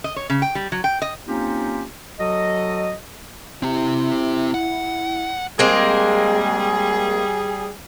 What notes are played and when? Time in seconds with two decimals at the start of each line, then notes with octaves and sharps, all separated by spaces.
0.04 D#5
0.16 C#5
0.30 C#3
0.42 G5
0.55 G3
0.72 F#3
0.84 G5
1.02 D#5
1.28 A#3 C4 C#4 D#4 F4 G4
2.20 F#3 F#4 A4 D#5
3.63 C4 E4 G4
4.54 F#5
5.59 G3 G#3 A#3 C4 G#4